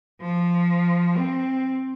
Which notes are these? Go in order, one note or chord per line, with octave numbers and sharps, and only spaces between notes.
F3
C4